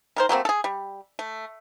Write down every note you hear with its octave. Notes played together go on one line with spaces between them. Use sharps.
D#3 A#4 C5
F#3 A3 A#3 C4
G#4 A4
G3
A3